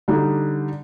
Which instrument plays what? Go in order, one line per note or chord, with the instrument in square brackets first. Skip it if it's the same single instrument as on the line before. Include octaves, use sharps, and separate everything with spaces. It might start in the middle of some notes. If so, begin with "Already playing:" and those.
[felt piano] D3 G3 D#4